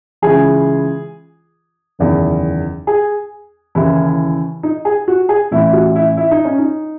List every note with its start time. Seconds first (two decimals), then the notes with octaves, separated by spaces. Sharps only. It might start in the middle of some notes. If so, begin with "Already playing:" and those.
0.22 C#2 C#3 E3 G#4
1.99 F#1 E2 D#3
2.87 G#4
3.75 D#2 C#3 E3 E4
4.63 D#4
4.85 G#4
5.08 F#4
5.29 G#4
5.51 A1 A2 E3 E4
5.73 F#4
5.96 E4
6.17 E4
6.31 D#4
6.45 C#4
6.59 D#4